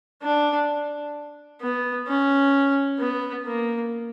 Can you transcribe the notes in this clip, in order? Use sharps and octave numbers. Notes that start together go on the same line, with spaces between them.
D4
B3
C#4
B3
A#3